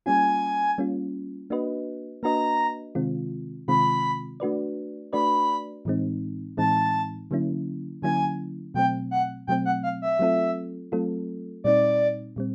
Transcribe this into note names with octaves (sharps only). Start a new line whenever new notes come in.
G3 A#3 C#4 F4 G#5
G3 A#3 C#4 F4
A#3 D4 F#4 B4 D#5
A#3 D4 F#4 B4 D#5 A#5
C3 D#3 G#3 C4 F4
C3 D#3 G#3 C4 F4 B5
A3 D4 F#4 B4 D5
A3 D4 F#4 B4 D5 B5
A2 E3 G#3 C4 D#4
A2 E3 G#3 C4 D#4 A5
D3 F#3 A#3 C#4 E4
D3 F#3 A#3 C#4 E4 G#5
B2 F#3 A3 C4 G5
F#5
B2 F#3 A3 C4 G5
F#5
F5
E5
F#3 A3 C4 F4 A4
F#3 A3 C4 F4 A4
A#2 G3 C4 D#4 D5
A#2 G3 C4